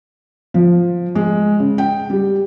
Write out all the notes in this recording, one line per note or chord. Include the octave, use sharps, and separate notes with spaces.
F3
G#3
C#3
G5
G3